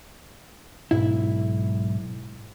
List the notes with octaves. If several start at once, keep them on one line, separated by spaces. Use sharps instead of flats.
B1 G#2 E4